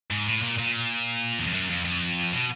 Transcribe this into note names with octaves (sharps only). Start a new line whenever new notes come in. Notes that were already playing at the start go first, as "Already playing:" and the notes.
G#2
A2
A#2
A#2
E2
F2
F#2
F2
F2
B2